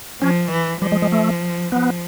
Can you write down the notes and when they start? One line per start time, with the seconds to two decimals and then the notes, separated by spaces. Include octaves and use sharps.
0.21 F3 C#4
0.51 E3
0.81 F3 G3
0.92 G#3
1.02 G#3
1.12 A3
1.72 F3 B3